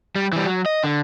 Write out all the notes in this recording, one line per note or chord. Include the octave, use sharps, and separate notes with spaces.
G3
E3 G3
F#3
D#5
D3